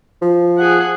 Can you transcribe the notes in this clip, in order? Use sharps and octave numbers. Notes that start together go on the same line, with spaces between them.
F3
G#4 F#5